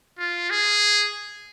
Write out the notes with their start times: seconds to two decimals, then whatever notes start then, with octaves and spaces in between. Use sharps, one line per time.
0.19 F4
0.50 G#4